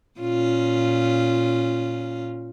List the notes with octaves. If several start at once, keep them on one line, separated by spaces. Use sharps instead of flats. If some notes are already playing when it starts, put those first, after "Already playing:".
A#2 C#4 F4